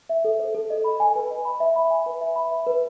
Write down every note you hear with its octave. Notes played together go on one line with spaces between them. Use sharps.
E5
A4
C5
A4
D#5
B5
G#5
B4
D#5
B5
E5
B5
G#5
B4
E5
B5
E5
B4